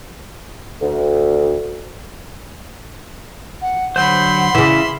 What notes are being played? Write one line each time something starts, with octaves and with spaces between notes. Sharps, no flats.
D2
F#5
D3 F#3 C5 F#5 B5 C6
C#3 E3 E5